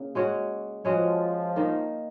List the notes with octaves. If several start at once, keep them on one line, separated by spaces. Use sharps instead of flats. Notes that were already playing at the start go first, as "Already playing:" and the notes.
Already playing: C#3 A#3
G#3 C#4 F#4 C#5
F3 G#3 C#4 F#4 C#5
D#3 A#3 D#4